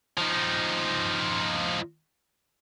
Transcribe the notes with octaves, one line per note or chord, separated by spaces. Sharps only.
F3 D#4